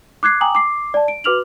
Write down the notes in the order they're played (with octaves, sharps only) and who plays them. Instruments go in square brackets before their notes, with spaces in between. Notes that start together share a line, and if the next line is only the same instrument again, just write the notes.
[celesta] D6 F#6 G#6 C7
G5 G#5 A#5 D6 D#6 F#7
D6 C7
D5 A5
D7
F#4 B4 D6 F6 F7 F#7